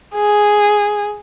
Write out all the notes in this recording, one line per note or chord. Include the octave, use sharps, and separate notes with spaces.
G#4